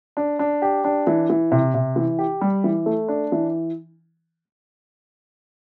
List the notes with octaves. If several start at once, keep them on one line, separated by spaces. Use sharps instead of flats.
D4
D4
G4
D4
E3
E3
C3
C3
E3
G4
G3
E3
A3
D4
E3